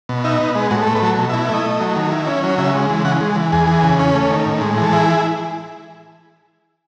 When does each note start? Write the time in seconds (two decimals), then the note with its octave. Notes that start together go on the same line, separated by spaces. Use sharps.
0.09 B2
0.24 D#4 E5
0.40 B3
0.55 G#3
0.71 A2 F#4
0.82 A4
0.87 A3
0.95 B4
1.02 F#3 A4
1.18 B2
1.30 E5
1.33 E4
1.49 A3 D#5
1.64 A3
1.80 F#3
1.96 D#3
2.12 E4
2.27 C#4
2.43 F#3
2.58 C#3 E5
2.75 G#3
2.89 E3
3.05 C#3 F#5
3.21 G#3
3.36 E3
3.52 E2 G#4
3.67 E3
3.83 C#3
3.99 C#4
4.14 A3
4.31 D#3
4.46 A2
4.61 G#3
4.77 E3
4.83 A4
4.93 E4 G#4